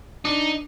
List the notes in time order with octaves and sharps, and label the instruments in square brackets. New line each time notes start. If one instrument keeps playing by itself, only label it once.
[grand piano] D4 [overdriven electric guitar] D#4